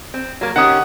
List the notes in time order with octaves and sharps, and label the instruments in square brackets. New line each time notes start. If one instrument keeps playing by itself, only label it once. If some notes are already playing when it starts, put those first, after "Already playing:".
[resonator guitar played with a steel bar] C4
F#3 A#3
[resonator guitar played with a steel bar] D#3 C#4 G4 [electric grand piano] F#5 D#6